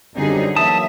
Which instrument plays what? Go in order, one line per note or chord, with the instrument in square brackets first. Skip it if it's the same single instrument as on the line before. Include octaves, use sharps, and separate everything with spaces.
[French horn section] F#2 G3 C4 [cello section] D3 D#4 G#4
[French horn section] E3 F#3 A#3 [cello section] E5 [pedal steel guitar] A5 D#6